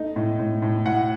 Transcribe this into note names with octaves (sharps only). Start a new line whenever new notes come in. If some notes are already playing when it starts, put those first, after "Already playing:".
Already playing: A3 D#4
A2
A2
A2
A2 F#5